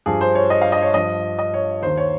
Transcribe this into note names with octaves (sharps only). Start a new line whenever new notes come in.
G2 F3 G#4
C5
C#5
D#5
F5
D#5
C#5
G2 F3 D#5
D#5
C#5
D#2 D#3 C5
C#5